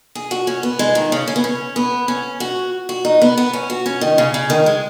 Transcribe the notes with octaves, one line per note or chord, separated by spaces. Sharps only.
G#4
F#4
C#4
B3
G#3
D#3
C#3
C#4
B3
C#4
B3
C#4
F#4
F#4
D#4
B3
B3
C#4
F#4
C#4
D#3
C#3
C#3
D#3
G#3